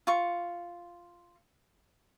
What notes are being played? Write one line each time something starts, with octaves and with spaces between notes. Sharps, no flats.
F4 C#6